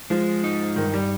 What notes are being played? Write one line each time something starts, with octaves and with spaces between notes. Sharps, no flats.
F3 G#3
D#4
G2 D#3
G3